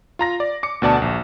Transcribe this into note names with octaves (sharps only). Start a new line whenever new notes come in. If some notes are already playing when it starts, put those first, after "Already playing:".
F4 A#5 A#6
D5
D6 C#7
D2 B2 D5 A5
A#1